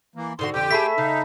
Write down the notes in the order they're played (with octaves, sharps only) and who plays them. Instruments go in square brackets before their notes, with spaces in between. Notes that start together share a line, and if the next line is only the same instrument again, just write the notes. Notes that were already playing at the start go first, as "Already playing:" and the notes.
[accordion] E3 A#3
[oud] G#2 D3 F#4 [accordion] C6
[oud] F2 D3 [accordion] G4 G5
[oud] A3 G#4 [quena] E5 [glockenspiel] A5 B5 B6
[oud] C#3 F5 [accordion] D#4